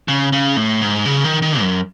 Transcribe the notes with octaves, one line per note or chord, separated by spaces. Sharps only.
C#3
C#3
A2
G#2
C#3
D#3
D#3
F#2